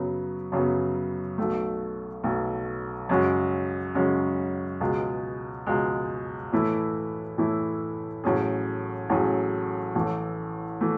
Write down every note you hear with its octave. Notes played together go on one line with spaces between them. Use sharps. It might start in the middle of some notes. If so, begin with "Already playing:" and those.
Already playing: F#2 C#3 F#3 B3
F#2 C#3 F#3 B3
B1 B2 A3
B1 B2 A3
F#2 C#3 G#3 C#4 F#4
F#2 C#3 G#3 C#4 F#4
C#2 B2 G#3
C#2 B2 G#3
A2 E3 A3 E4
A2 E3 A3 E4
A1 A2 F#3 C#4 G#4
A1 A2 F#3 C#4 G#4
A1 A2 E3 A3
E3 A3